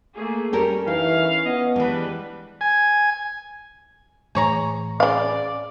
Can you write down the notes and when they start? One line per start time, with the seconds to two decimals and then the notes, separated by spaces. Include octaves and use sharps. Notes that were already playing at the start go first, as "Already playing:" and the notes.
0.15 A3 A#3 G#4
0.53 G3 C#4 G4 A4 A#4
0.87 E3 D#4 F5
1.45 B3 D#5
1.76 E3 G3 G#3 D4 B4
2.61 G#5
4.35 A2 E3 A3 G#4 C#5 A#5
5.00 C#3 D5 F5